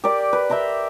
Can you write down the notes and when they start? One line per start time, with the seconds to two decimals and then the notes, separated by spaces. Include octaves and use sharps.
0.04 G4 A#4 D5
0.33 B4
0.50 E5 G5 A#5 C6